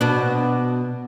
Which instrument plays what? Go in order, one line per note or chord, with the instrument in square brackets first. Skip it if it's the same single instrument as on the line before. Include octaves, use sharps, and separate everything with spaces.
[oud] B2 D4